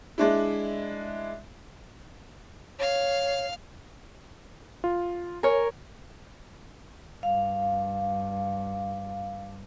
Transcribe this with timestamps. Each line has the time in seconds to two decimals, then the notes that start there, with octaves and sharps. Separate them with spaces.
0.18 G#3 D4 E4
2.79 C#5 F5
4.84 F4
5.43 A#4 C#5 G#5
7.23 G2 F5